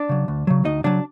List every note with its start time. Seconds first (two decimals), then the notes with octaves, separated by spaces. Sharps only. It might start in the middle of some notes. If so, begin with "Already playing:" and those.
Already playing: D4 D5
0.09 C#3 F#3
0.28 D2
0.47 C#3 F#3
0.65 D2 D#4 D#5
0.84 C#3 F#3 D4 D5